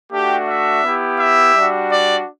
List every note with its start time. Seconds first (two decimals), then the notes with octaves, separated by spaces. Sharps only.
0.12 A3 D4 F#4 G4
0.48 E5
0.84 B3 E4 G4
1.20 E5
1.55 G3 D4 F#4
1.91 D5